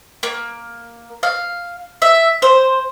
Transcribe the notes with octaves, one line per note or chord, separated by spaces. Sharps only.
A#3
F5
E5
C5